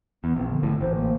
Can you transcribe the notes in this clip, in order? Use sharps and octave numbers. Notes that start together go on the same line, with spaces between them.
E2 B3
A#1 C4
D3
G#1 A2
A1 C5
A#3